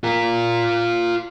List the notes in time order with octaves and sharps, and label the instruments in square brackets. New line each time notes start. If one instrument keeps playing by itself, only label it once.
[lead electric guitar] F4 A#4